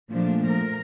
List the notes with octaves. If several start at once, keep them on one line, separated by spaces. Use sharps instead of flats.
A#2 F3 A3 D4
A#4